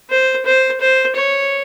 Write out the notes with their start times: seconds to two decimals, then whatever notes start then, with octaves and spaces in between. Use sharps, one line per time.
0.10 C5
0.46 C5
0.81 C5
1.16 C#5